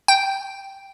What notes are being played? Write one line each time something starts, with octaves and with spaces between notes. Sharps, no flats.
G5